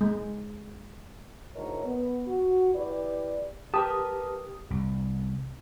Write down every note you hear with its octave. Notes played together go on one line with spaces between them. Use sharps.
G#3
D2 G#2 E4 A#4 C#5 D#5
B3
F#4
E4 G4 B4 D5
G4 A#4 B4 A5 D#6
C2